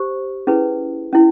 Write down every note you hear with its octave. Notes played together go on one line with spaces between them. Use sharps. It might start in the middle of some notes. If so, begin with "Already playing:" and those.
Already playing: G4 C5
C#4 E4 G#4 B4
C#4 E4